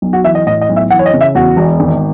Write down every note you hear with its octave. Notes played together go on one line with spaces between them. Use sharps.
B1
F#4
E3 E5
D#5
A2 D#5
D#5
B1
E5
E3 F#5
C#5
D#5
C#3
E5
E2 F#4
E1
G#1